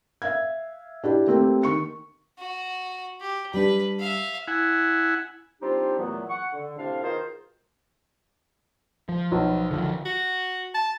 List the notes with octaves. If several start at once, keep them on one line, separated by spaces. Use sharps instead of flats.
E5 F5 G#6
D4 E4 G4
A3 A#3 C4 G4
D#3 C#6 C#7
F#4
G4
G3 D4 B4
E5 F5
E4 F#5 G#5
G3 C4 D4 D#4 F4 G4
E2 A#2 E3 F#3 A3 B3
F#5 C#6
D3
A2 C3 D4 F5
B2 D#3 F4 G#4 A#4 C5
F3
B1
D3 D#3 F3
F#4
A5